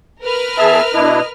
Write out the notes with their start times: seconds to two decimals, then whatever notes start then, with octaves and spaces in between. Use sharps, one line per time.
0.22 A#4 B4 F6
0.58 E2 G#4 E5 A5
0.94 B2 D4 E4 D#5